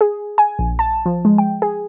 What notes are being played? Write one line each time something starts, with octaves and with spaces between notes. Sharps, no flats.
G#4
G#5
A#1
A5
F3
G#3
G5
G#4